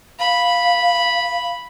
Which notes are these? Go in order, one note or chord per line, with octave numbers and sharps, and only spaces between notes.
F5 B5